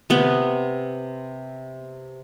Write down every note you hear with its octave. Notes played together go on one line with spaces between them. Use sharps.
C3 B3